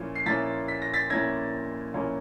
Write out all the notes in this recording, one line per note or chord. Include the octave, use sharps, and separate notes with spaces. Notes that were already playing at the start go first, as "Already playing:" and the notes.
Already playing: A#2 F3 A#3 C#4 E4
C7
A#2 F3 A#3 C#4 E4 A6 B6
B6
A#6
A6 B6
A#2 F3 A#3 C#4 E4 G#6 A#6
A#2 F3 A#3 C#4 E4